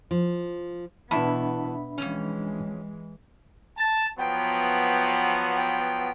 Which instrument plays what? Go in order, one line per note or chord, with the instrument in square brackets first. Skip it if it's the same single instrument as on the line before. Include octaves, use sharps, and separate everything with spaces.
[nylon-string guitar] F3
[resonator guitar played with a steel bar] E2 E4 A5 [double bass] B2 B3 [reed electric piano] D4 E5 B5
[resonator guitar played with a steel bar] F2 G#2 C#4 [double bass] E3 G#3
[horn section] A5
[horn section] F3 F#3 B3 [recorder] G5
[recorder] G5